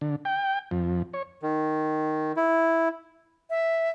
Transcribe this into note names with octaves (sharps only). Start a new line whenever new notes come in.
D3
G5
F2
C#5
D#3
E4
E5